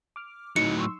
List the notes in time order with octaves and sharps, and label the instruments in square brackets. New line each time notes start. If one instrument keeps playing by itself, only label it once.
[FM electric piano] D6 F6
[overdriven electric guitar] A2 F#3 [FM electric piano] D#4 [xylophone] C#7
[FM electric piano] C6 C#6 E6